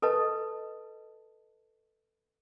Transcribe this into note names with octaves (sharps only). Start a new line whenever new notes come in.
A4 B4 D#5 A5